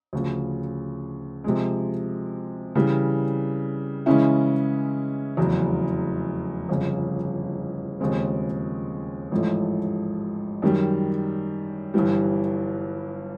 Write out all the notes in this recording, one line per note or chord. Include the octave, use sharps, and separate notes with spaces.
D2 C#3 F3
C3 F3 G#3
C#3 E3 G3
C#3 E3 G#3 C#4 E4
F1 E2 C#3 F#3
G1 F2 C#3
D#2 C#3 F3 G#3 C4
A1 G#2 F3 A3
F#2 D#3 G3
G1 G2 E3 G3